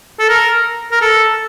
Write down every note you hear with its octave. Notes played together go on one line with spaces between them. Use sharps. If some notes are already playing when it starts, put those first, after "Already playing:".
A4
A#4
A#4
A4